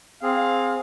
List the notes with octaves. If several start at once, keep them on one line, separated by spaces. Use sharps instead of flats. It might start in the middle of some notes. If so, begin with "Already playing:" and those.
C4 G#4 F5